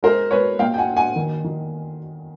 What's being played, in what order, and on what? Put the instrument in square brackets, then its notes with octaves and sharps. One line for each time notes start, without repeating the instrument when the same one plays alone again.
[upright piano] G#3 A#4 C5
G#3 B4 C#5
A#2 F5 G5
G5
F#5 G#5
D4
F#5 G#5
D#3
D#3